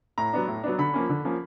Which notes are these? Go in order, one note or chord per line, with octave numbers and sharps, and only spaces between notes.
A2 A#5
F#3 B3 D4
A2
F#3 B3 D4
D3 B5
F3 A#3 C#4
D3
F3 A#3 C#4